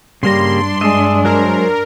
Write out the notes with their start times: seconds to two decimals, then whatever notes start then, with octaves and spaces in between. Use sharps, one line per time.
0.23 G2 C#3 G3 A#3 D4 A#5 C6
0.81 G#3 D#5 E5
1.25 F#3 A#4 C5